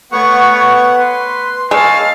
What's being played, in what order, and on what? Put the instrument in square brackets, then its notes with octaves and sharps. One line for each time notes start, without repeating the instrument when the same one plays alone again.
[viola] A3 C#5 [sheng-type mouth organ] B3 F#5 C#6
[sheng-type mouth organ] B4 [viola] C6
[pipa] G#3 [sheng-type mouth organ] C#5 E6 [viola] F5 A5